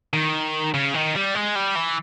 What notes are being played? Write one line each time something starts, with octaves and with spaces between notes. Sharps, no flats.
D#3
C#3
D#3
G3
G#3
G3
E3